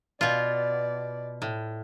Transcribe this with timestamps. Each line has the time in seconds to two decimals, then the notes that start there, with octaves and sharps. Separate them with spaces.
0.21 B2 F4 D5
1.42 A2